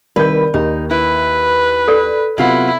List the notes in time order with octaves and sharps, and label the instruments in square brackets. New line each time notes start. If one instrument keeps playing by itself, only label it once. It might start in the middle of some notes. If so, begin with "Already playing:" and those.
[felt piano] C2 D#3 G6 [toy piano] A#4 D5 [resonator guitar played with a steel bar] B4
[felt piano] D#2 [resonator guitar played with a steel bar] D#4
[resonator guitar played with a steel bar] E4 [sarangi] B4
[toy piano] A4 D5
[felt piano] C3 B3 [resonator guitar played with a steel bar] F#3 F4 F#5 [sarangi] E4